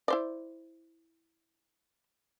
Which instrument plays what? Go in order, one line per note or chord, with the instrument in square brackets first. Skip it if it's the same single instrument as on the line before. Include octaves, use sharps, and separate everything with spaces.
[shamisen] E4 C5 D5